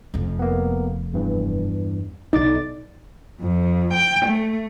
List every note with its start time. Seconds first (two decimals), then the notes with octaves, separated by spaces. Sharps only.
0.14 F1 F2
0.39 A#3 B3
1.13 E2 G2 E3
2.33 B1 F#3 D#4 D5 D6 A6
3.41 F2
3.93 G5
4.25 A3